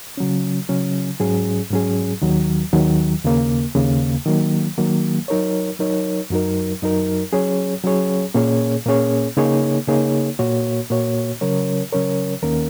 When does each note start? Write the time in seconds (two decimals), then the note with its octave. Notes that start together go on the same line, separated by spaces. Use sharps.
0.17 C#3 F#3 C#4
0.69 C#3 F#3 C#4
1.20 G#2 F#3 C#4 G#4
1.71 G#2 F#3 C#4 G#4
2.22 D#2 D#3 F#3
2.72 D#2 D#3 F#3
3.24 D#2 C#3 A#3
3.75 D#2 C#3 A#3
4.26 D#3 F#3 A#3
4.78 D#3 F#3 A#3
5.28 F#3 D#4 A#4 C#5
5.79 F#3 D#4 A#4 C#5
6.30 F#2 F#3 D#4 A#4
6.82 F#2 F#3 D#4 A#4
7.32 F#3 C#4 G#4 C#5
7.84 F#3 C#4 G#4 C#5
8.34 A#2 A#3 C#4 G#4 C#5
8.85 A#2 A#3 C#4 G#4 C#5
9.37 C#3 A#3 D#4 G#4 C#5
9.87 C#3 A#3 D#4 G#4 C#5
10.39 A#2 A#3 F#4 C#5
10.90 A#2 A#3 F#4 C#5
11.41 C#3 F#3 C#4 A#4 C#5
11.93 C#3 F#3 C#4 A#4 C#5
12.42 D#2 D#3 A#3 C#4 A#4